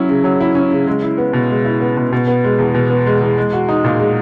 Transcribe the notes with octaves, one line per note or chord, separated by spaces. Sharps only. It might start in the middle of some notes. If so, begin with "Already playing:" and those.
Already playing: F#3 C#4 E4
C#3
F#3
E4
C#4
C#3
G#3
E4
B3
B2
G#3
E4
B3
B2
B2
B3
G#3
E2
B2
B3
G#3
E2
G#3
F#4
D#4
A#2
G#3